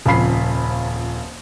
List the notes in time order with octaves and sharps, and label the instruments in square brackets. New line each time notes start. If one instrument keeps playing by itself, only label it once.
[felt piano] D#1 F2 C#3 F4 B5 C7